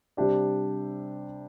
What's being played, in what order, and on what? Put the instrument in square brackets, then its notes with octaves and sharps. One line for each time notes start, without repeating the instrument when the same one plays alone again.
[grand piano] C3 G3 D4 G4 D5